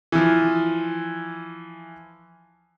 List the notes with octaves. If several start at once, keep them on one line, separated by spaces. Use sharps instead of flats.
E3 F3